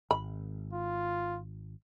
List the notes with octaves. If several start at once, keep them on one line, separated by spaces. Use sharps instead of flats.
G#1 B5
F4